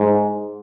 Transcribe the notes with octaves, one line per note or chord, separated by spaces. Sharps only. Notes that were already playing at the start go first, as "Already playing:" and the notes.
Already playing: G#2